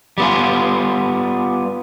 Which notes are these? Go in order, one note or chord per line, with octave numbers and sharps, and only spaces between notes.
G3 B3 F4